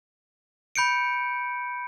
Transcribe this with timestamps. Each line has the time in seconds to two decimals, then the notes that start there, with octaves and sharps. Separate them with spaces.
0.76 B5 G6 C#7 D7